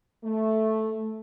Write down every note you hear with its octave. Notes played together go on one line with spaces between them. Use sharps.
A3